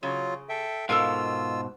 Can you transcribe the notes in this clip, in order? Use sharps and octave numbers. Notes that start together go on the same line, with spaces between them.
C#3 F#3 F4
A4 E5 G5
G#2 B2 F4 A4 A#4 F5 E6